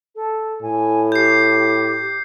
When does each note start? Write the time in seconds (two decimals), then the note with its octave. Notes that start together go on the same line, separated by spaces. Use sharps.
0.16 A4
0.62 A2 G#5
1.12 G4 G6 C7